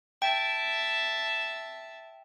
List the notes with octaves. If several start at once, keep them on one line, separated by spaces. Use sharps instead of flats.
E5 G5 A5